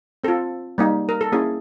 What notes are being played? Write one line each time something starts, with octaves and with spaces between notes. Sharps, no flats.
C4 F4 A4
G3 A#3 D#4
A#4
A4
A#3 C#4 E4 G#4